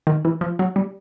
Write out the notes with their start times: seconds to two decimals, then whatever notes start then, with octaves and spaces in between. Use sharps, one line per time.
0.07 D#3
0.25 E3
0.41 F3
0.59 F#3
0.76 G3